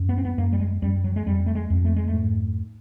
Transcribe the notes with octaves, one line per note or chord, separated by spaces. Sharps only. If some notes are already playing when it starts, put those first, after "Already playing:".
Already playing: F#2
B3
C4
B3
F#2 A#3
G3
G#3
F#2 G3
F#3
G#3
F2 G3
A3
G#3
F2
A3
G#3
A3
G#2